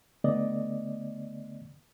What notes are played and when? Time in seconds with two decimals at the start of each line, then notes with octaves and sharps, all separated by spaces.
0.24 D3 A3 B3 D5 D#5